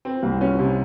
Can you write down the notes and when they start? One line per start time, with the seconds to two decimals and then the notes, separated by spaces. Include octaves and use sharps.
0.05 C4
0.23 C2
0.41 C#4
0.59 C3